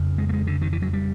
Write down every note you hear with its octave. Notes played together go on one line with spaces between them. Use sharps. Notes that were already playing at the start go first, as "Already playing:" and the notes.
Already playing: F2 C#3
G#3
A3
G#3
D3
D#3
E3
F#3
G3